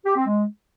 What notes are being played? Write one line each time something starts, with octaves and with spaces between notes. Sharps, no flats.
G4
C4
G#3